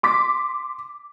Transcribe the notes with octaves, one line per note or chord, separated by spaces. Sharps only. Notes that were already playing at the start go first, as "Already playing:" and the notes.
C6 D6 B6